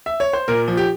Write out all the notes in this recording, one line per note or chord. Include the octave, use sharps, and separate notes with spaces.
E5
C#5
C5
A#2 A#4
F3
G4